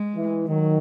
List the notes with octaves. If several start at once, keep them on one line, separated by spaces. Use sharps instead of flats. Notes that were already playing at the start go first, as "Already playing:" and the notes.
Already playing: G#3
E3
D#3 F#3